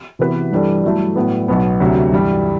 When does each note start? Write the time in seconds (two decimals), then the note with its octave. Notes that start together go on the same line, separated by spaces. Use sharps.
0.19 C3 E3 B3 F#4 B4
0.52 G2 E3 G3 D4 A4
0.84 G2 F#3 A3 E4 A4
1.16 A2 F#3 B3
1.48 B1 B2 F#3 B3
1.80 D2 C3 F#3
2.12 G2 E3 G3